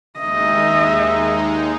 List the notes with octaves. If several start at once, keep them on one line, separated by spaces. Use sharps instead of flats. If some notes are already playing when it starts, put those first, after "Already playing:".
D#2 G#3 D#4 D#5 E5